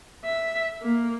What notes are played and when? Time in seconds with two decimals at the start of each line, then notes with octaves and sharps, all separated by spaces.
0.25 E5
0.83 A#3